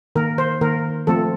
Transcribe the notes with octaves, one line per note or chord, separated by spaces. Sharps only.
D#3 A#3 A#4
C5
D#3 A#3 A#4
F3 A3 C4 A4